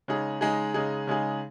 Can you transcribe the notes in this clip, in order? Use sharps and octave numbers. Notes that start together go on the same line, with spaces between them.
C#3 G#3 D#4 G#4
C#3 G#3 D#4 G#4
C#3 G#3 D#4 G#4
C#3 G#3 D#4 G#4